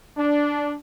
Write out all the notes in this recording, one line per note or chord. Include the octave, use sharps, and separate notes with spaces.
D4